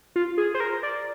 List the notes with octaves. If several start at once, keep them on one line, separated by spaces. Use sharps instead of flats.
F4
G#4
C5
A#4
D5